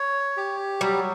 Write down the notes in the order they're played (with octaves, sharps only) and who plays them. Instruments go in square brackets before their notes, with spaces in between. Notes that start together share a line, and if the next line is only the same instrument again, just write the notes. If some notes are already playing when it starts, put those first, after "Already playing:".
Already playing: [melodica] C#5
G4
[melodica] F#3 [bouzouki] G3